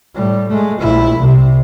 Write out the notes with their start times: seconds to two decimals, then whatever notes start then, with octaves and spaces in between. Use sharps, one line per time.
0.15 A2 G3
0.48 G#3 A3
0.80 A#1 E4
1.19 C2 C3